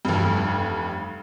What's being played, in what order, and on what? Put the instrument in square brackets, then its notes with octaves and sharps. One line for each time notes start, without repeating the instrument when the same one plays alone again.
[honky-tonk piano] F1 G2